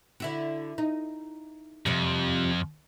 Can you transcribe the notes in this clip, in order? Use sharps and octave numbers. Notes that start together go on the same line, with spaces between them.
D3 E4 F#4
D#4
F2 C3 F3 G3